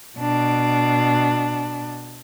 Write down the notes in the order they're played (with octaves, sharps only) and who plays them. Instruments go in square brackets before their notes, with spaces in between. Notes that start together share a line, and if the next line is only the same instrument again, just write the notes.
[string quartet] B2 D4